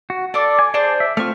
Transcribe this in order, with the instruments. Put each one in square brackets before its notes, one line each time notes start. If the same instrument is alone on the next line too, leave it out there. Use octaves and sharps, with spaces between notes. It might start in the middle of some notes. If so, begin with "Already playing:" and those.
[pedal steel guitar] F#4
[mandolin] D4 D6 [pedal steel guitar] A4
[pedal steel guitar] G#5
[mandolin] D4 C5 [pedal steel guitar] G#4 D5 A5
[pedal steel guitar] E5
[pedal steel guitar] A3 C4 F4 [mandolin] C#6 F6